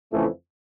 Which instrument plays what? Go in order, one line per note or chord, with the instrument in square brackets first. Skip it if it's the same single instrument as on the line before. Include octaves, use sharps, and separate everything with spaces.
[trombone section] F2 C#3 E3 A3